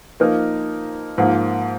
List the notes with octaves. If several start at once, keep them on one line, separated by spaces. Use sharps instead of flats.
F3 A#3 D#4 A#4
G#2 F3 A#3